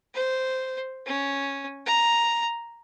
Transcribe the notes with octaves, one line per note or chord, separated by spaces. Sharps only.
C5
C#4
A#5